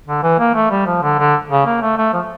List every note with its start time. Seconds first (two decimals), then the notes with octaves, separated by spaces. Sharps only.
0.07 D3
0.23 E3
0.39 A#3
0.55 A3
0.71 G3
0.86 F3
1.02 D3
1.19 D3
1.50 C#3
1.66 A#3
1.82 A3
1.97 A3
2.13 F3